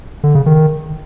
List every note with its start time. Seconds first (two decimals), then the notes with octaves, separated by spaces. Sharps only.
0.24 D3
0.35 C#3
0.46 D#3